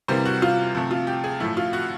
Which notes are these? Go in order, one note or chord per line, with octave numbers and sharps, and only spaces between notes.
C3 E3 G3 A#3 C5
F#4
F4
C3 F3 A3
F4
G4
G#4
A2 F3 A3 E4
F4
F#4